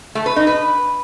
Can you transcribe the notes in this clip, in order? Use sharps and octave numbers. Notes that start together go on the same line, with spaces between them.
A3
B4
D#4
B4